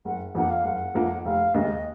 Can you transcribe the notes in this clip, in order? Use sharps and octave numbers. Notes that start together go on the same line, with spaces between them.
F#1 F#5
F2 F3 A#3 F#5
F5
F#1 F#5
F2 F3 A#3
F1 F5
D#2 C#3 G#3 D#5